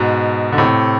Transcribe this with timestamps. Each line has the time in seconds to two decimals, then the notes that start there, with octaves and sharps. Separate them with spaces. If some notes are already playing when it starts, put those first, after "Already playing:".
Already playing: G#2 B2
0.52 D3
0.58 A2 C3